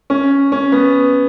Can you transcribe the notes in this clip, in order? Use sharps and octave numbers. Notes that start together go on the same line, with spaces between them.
C#4
C#4
B3